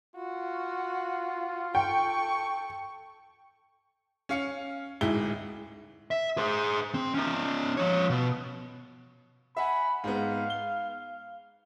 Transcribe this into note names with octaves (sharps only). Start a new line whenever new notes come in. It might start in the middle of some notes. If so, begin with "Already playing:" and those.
F4 F#4
A4 G5 C#6
C#4 F5 C#7
D1 G#2 E4 G7
E5
G#4 C5
C4
C#4 D#4
F3 C#5
B2
E5 F#5 G#5 B5
G#2 B3 F5
G7